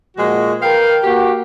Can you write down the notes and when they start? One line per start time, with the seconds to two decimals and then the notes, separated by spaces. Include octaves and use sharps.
0.17 A#2 F3 G#3 F#4
0.61 A#4 B4 F5 G5
1.03 A#3 F#4 G4